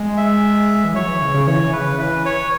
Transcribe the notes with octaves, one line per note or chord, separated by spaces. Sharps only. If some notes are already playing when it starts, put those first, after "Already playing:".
Already playing: G#3
E5
E3
F#3 C#5
E3
C#3
C#3
E3 C#5
C#3 B4
E3 B4
C#5